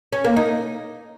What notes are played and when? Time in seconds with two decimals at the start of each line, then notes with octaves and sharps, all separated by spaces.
0.13 C#4
0.24 A#3
0.36 D#4